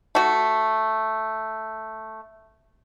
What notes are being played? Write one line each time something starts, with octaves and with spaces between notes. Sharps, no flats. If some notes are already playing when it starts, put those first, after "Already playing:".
A3 F#4